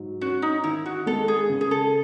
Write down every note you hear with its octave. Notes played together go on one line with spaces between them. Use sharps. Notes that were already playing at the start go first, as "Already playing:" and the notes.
Already playing: G#2 F#3
C#4 F#4
D#4
D#3 E4
F#4
G#3 A4
G#4
C#3
G#4
A4